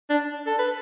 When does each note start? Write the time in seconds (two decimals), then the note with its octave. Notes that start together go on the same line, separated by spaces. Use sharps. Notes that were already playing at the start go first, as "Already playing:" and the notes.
0.10 D4
0.47 A4
0.59 B4